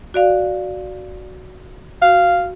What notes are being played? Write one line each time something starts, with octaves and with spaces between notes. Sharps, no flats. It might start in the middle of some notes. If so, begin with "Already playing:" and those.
F#4 D5 F5
F#4 F5